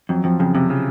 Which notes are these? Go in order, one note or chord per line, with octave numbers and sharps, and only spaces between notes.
F2 F#3
F2 F3
F2 C#3
F2 C3
C#3